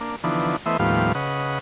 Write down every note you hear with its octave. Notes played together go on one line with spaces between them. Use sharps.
A#3 D4
D3 E3 F3 B3 D4 D#4
E3 A3 B3 C5 D#5 E5
D#2 A2 F3 G3 B3 F5
C#3 B4 D#5 F#5